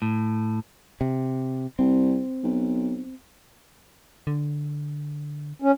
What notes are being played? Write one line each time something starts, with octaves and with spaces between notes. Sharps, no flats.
A2
C3
C2 C4
B1
D3
C#4